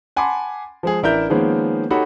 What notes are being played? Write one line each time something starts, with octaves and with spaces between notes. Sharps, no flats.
F#5 G#5 A5 B5 C6 D6
F3 G#3 G#4
A1 D4 E4 A#4 E5 G6
D#3 F3 G#3 A#3 B3 C#4
D#4 F#4 G4 A4 C#5 B5